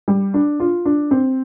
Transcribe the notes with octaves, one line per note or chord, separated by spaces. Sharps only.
G3
D4
F4
D4
C4